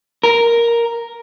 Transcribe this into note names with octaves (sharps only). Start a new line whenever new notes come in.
A#4